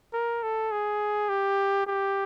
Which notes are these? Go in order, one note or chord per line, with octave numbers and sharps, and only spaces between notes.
A#4
A4
G#4
G4
G4